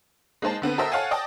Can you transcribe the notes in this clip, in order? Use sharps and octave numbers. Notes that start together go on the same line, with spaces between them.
G#3 A#3 D#4 C5 A5
D3 B3 C4
F#4 A4 A#4 C5 D#5 E5
A4 C#5 F5 F#5 G#5
D5 D#5 G5 A5